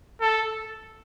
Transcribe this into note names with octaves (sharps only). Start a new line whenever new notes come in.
A4